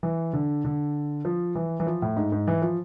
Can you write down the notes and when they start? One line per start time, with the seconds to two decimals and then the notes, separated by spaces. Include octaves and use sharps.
0.03 E3
0.33 D3
0.65 D3
1.25 F3
1.55 E3
1.80 E3
1.87 F3
2.02 A2
2.16 G#2
2.32 G#2
2.47 E3
2.62 F3